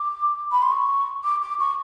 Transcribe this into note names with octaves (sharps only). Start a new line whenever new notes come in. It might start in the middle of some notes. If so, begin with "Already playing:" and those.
Already playing: D6
B5
C6
C#6
D6
D6
C#6